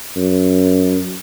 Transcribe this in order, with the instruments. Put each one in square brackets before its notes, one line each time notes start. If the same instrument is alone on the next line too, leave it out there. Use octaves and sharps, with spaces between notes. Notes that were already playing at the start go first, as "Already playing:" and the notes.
[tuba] F#2